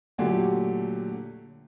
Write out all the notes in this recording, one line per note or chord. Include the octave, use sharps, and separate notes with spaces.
A#2 D3 F#3 A3 G4